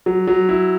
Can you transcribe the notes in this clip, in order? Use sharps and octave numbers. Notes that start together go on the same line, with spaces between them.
F#3
F#3
E4